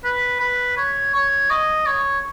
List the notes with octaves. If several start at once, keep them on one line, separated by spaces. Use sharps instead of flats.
B4
B4
C#5
C#5
D#5
C#5